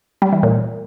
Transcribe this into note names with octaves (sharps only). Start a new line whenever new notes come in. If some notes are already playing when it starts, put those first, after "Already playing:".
G3
E3
A#2